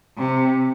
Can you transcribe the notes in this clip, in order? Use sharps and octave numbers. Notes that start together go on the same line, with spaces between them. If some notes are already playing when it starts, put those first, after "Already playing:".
C3